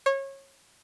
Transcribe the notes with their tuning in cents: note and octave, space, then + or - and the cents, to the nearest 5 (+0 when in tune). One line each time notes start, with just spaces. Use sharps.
C#5 -25